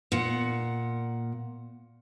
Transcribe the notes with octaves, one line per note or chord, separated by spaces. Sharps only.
A#2 F#5